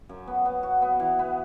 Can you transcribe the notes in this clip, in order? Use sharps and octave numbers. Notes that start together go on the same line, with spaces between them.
F#2
B3
B3
F#4
B3
E3
B3